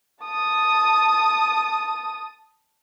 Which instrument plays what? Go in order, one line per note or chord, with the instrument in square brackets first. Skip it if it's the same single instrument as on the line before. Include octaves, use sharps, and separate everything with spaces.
[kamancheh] A5 D#6